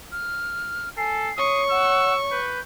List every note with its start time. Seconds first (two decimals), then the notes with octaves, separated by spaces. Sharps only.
0.12 F6
0.97 A4 G#5 C7
1.38 C#5 C#6 D#6
1.71 F#5 E6
2.31 B4 G6